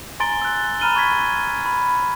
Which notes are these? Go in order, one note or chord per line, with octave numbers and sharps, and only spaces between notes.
G#5 A#5 C6 A6 D7 G7
E6 F#6
A#5 B5 F6 D#7 F#7 G7
C#6 G#6 B6
B5